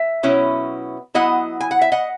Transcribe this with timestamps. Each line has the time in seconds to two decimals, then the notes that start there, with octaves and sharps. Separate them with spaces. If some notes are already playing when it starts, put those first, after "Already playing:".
Already playing: E5
0.23 B2 F#3 C#4 E4
1.14 F#3 B3 E4 D#5 F#5
1.60 G#5
1.71 F#5
1.81 E5
1.92 D#5 F#5